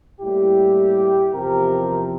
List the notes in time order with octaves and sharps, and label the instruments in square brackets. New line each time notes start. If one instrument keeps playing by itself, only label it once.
[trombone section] A2 G3 A#3 E4 G4
E2 C3 F3 C4 G4 A#4